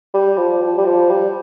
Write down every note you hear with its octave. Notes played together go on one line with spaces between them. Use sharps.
G3
F3
F3
G3
F3
G3